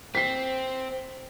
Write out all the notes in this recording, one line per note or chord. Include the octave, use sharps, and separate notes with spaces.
C4 B6 C7